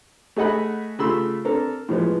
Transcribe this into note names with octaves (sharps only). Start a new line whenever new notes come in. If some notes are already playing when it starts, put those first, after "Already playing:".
A3 G#4 D#5 F#5 B5
C#3 A3 F4 B5 C6 E6
C4 D4 A4 A#4
A2 F3 G#3 B3